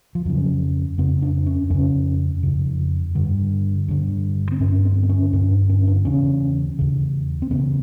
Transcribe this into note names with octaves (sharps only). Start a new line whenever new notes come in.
F3
F2 C#3 F#3
F2 C#3 C4
D4
C#4
F2 C#3 C#4
F2 C#3
G2 D3
G2 D3
C4
G2 D3 C#4
C4
C4
C#4
G2 D3 C#4
D4
C#4
D4
E2 C#3 C#4
E2 C#3
C4
E2 C#3 B3